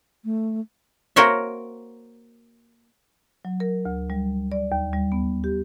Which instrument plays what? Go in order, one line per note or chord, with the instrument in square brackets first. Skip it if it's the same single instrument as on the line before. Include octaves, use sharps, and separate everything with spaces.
[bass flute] A3
[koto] A#3 F#4 A#4 C5 C#5 E5
[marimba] F#3
A#4
D2
G3
D5
D#2
G3
B3
G4